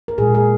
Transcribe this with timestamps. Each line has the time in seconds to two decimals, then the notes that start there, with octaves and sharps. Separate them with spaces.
0.08 A#4
0.18 A#2 G#3 G#4
0.35 G#4